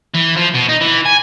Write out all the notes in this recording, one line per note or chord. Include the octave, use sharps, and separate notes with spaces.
E3
F3
B2
D#4
E3
G#5